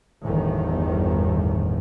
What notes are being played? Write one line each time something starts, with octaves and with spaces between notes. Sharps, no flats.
G1 E2 A2 D#3